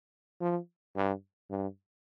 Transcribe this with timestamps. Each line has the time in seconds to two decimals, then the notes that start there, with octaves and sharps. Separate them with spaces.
0.41 F3
0.96 G2
1.50 G2